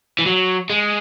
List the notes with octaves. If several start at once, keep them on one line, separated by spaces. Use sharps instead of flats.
E3
F#3
G#3